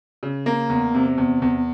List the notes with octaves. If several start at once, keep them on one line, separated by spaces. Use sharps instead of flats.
C#3
A#3
E2
C3
E2
E2